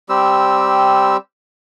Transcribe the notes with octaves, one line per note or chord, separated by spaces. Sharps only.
G3 C4 G4 E6